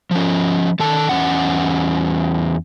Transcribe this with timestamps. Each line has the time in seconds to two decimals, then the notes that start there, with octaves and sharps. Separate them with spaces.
0.11 F3 C#4
0.80 D#3 A4 A5
1.09 E2 C#4 F#5